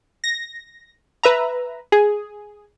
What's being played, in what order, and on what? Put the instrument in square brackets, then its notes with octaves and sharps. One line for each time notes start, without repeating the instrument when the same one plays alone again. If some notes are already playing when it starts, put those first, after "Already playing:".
[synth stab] A#6
B4 E5 A#5
G#4